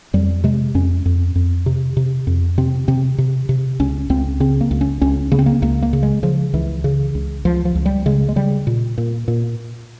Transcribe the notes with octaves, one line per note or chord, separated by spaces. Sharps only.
F2 G3
C3 G#3
F2 C#4
F2
F2
C3
C3
F2
C3 C4
C3 C4
C3
C3
C#2 C#4
C#2 C4
C#3 C4
A#3
C#2
C#4
C#2 C#4
C#3 A#3
C4
A#3
C#2 A#3
A#3
C#3
G#3
C#3 F3
C#2 E3
C#3
C#2
C#2 F3
F3
C#2
G3
C#3 G#3
G#3
C#3 G3
A#2
A#2
A#2